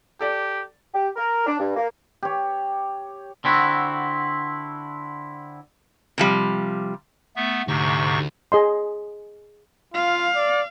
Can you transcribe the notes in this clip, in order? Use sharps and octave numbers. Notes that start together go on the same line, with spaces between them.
G4 A4 D5
G4
A#4
D4
G2
A#3
G4 C#5
D3 C4 E4 F#4
C3 F3 G3
A3 B3 E5
D2 G#2 C3 C#6
G#4 D#5 C6
F4 F5
D5